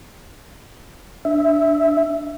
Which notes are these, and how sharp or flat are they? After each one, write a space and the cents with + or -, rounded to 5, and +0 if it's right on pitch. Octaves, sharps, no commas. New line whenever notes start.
D4 +0 E5 +0